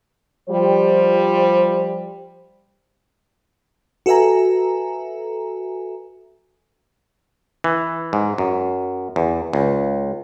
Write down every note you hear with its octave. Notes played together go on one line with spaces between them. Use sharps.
F3 G3 C5
F#4 A4 B4 E5 G#5 A#5
E3
G#2
F#2
E2
C#2